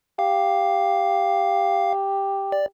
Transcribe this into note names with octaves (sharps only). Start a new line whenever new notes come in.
G4 F5
D5